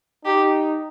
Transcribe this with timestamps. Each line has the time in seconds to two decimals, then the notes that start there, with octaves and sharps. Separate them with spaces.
0.25 D#4 G4